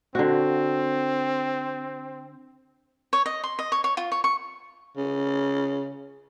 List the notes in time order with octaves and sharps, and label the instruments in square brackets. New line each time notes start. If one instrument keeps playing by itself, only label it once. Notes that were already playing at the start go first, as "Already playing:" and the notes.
[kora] D3 F#4 [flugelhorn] C4
[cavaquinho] C#5
D#5
C6
D#5
C#5
C#5
F4
C#5
C#6
[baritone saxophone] C#3